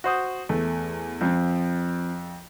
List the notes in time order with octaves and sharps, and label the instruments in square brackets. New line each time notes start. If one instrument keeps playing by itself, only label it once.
[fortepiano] F#4 C5 D#6
[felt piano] E2 [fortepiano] A3
[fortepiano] F2 [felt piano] F3 C4